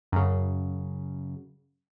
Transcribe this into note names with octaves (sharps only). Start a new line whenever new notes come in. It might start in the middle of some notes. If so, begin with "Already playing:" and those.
F#2 C#3